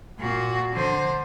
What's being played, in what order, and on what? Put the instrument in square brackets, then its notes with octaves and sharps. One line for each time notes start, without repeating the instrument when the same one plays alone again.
[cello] A#2 F#4
D3 C5